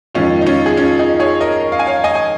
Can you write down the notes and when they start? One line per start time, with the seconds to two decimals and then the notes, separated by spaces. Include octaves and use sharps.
0.15 F2 D#3 G#3 C#4 F4
0.41 D#4
0.46 C#4 F4
0.66 G#4
0.77 C#4 F4
0.99 D#4 G#4
1.20 G#4 C#5
1.40 A#4 D#5
1.72 F5
1.79 G#5
1.87 C#5 F5
2.04 D#5 G#5
2.15 G#5